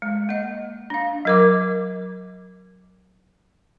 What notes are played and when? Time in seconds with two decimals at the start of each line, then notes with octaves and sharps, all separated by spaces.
0.02 G#3
0.29 A#3 D#5
0.90 D4 F5
1.25 F#3 A#4 D6